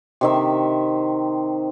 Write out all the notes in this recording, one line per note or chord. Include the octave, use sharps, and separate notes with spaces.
C3 D#3 E5